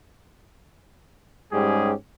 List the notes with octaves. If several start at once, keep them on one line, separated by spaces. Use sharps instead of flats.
G#2 G3 C#4 G4 G#4